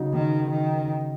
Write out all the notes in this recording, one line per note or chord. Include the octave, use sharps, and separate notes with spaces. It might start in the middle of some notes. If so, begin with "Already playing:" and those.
Already playing: C#3 F#3 D#4
D#3
D#3